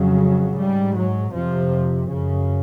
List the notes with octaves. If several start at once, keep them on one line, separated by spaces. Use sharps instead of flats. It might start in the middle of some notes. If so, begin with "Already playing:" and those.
Already playing: F2 C#3 F#3
G#2 G3
F#3
F2 C3 F3
F#2 C#3